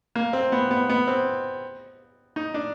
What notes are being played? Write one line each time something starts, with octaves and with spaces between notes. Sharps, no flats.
A#3
C4
B3
B3
B3
C4
D#4
D4